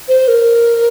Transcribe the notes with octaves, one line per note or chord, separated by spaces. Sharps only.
C5
A#4